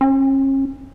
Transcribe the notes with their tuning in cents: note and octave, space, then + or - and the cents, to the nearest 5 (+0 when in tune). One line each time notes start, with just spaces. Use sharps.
C#4 -40